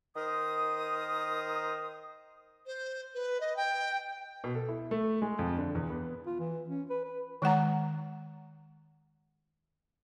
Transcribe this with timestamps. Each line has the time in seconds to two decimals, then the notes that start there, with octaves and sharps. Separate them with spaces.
0.15 D#3 A#4 C5 D#6
2.66 C5
3.14 B4
3.40 D#5
3.56 G5
4.44 B2
4.55 A4
4.69 E4
4.91 A3
5.22 G#3
5.39 F2
5.57 D3
5.75 E2
5.90 B3
6.26 F4
6.40 E3
6.69 C#4
6.90 B4
7.05 B4
7.42 D#3 G#3 F#5 A#5